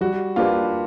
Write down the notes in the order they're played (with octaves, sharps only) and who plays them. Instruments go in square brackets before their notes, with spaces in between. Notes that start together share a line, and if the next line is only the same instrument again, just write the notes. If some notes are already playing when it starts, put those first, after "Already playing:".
[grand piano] G3 [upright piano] F#4
[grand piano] A#3 D4 G4 B4 [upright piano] F4